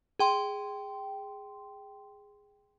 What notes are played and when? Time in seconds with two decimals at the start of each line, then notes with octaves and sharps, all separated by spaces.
0.19 G#4 G5 C6